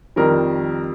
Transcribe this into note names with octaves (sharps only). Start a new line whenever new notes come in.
F2 D#3 G3 A#4